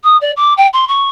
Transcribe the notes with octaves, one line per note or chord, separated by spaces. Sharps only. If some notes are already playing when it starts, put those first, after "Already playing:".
D#6
D5
D6
G5
C6
C#6